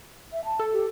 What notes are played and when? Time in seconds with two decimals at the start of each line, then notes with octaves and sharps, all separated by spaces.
0.33 E5
0.45 A5
0.59 A4
0.73 G4